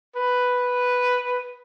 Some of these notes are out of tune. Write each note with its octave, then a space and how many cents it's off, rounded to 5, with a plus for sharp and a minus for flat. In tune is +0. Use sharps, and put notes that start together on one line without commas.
B4 +0